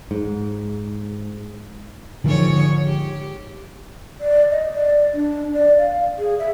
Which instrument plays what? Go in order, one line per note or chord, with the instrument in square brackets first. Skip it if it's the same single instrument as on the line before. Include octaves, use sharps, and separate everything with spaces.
[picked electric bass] G#2
[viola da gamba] G#2 D#3 C#5 [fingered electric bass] D3 F3
[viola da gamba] G4
[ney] D5
D#5
D5
D4
D5
F5
G#4
E5